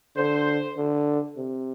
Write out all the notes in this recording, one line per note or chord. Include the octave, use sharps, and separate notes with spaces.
D3 C5
D3
C3